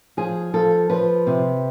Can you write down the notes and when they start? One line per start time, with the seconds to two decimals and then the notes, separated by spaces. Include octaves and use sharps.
0.17 F3 G#4
0.54 F3 A4
0.90 F3 B4
1.27 C3